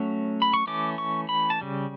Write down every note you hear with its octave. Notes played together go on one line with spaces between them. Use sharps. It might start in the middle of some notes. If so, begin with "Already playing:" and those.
Already playing: F#3 A3 C#4
B5
C#6
E3 A3 C#4 D6
C#6
B5
A5
C#3 G3